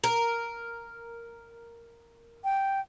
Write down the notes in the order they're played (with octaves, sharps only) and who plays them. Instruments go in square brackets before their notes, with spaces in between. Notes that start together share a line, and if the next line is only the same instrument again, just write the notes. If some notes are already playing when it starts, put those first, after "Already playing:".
[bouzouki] A#4
[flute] G5